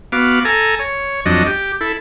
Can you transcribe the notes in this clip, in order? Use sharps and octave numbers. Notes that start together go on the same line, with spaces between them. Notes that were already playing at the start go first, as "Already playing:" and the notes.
B3 F#4 F5 D6
A4 G#5 A#5
C#5
F2 F#3 D4 D#5
G4
E4 A4